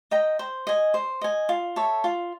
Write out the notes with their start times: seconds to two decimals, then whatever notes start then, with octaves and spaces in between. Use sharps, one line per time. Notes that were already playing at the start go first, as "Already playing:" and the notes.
0.11 D#5 G5 A#5
0.39 C5
0.67 D#5 G#5
0.94 C5
1.21 D#5 G#5
1.49 F4
1.76 A4 C#5 E5
2.04 F4